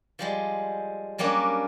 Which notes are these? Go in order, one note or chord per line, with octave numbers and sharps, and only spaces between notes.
F3 G3 G#3
F#3 G3 A#3 C#4 D4